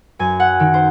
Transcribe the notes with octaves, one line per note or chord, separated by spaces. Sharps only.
F#2 G#5
F#5
D#3
C5